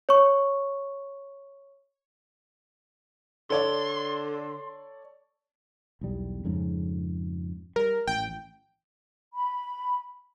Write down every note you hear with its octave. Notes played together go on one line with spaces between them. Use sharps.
C#5 C#6
D3 A4 C#5 D5 C6
B1 E2 G3
F2 G#2 C#3
G3 A#4
A1 G5
B5